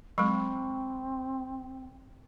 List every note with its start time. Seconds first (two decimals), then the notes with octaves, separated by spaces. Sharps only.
0.18 F#3 G#3 C4 B5 C#6